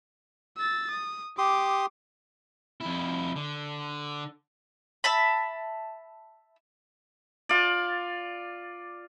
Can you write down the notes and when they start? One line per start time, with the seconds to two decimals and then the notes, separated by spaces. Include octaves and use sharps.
0.58 E6 A6
0.91 D#6
1.38 G4 C6 D6 D#6
2.81 F2 E4
3.36 D3
5.04 E5 A5 B5
7.49 F4 D5